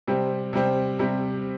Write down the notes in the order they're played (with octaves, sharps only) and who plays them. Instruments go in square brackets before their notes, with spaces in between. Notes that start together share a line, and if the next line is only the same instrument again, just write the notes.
[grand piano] C3 G3 C4
C3 G3 C4
C3 G3 C4